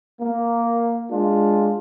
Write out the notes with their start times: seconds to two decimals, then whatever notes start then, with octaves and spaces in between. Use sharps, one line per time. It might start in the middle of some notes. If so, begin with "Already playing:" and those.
0.20 A#3
1.10 G#3 D4 F4